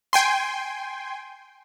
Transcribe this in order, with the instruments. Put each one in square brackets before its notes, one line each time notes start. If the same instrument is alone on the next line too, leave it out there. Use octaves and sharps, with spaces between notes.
[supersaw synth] G5 G#5 C6